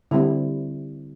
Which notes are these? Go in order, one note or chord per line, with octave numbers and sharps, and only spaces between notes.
D3 G3 C4 E4